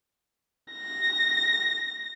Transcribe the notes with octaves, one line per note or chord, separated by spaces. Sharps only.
A#6